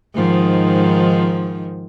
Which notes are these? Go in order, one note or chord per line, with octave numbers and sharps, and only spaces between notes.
G#2 D#3 F3